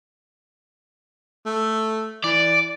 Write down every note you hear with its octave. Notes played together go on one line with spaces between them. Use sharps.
A3
E3 D5